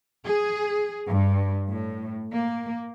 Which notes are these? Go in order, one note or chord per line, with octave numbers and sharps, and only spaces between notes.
G#4
G2
A2
A#3